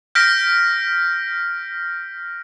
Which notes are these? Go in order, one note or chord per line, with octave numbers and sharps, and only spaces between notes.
F6 G6 A#6 B6 D7